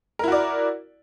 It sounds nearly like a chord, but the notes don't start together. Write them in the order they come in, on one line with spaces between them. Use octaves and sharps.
A#4 E4 F#4 D5